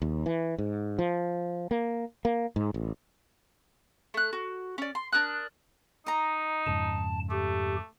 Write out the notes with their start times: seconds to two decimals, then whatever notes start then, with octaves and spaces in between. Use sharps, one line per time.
0.02 D#2
0.26 E3
0.58 G#2
0.99 F3
1.71 A#3
2.25 A#3
2.56 G#2
2.74 A1
4.14 A3 F#6
4.33 F#4
4.78 C#4 D5
4.95 C6
5.12 D4 A#4 D#6 F#6
6.06 D#4 D#5 A#5
6.66 F2 G#2 C#3 A5
7.30 A3 G4